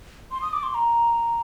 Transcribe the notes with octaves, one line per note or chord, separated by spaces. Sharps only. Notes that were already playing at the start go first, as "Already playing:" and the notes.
C6
D#6
D6
C6
A#5